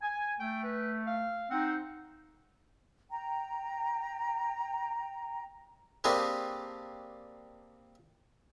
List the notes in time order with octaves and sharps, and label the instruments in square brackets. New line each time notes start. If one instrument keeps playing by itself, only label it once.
[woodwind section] G#5
[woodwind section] A3 [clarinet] G5
[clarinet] B4
F5
[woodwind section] C4 D#4 C5 [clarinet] F#5
[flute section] G5 A#5
[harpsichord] A#3 C4 D4 G4 G#4 B4